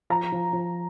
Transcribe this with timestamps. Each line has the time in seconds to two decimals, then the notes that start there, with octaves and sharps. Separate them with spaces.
0.10 F3 A#5
0.32 F3
0.53 F3